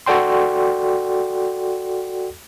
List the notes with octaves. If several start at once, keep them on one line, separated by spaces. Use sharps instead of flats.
F#4 A4 D5 G5 C6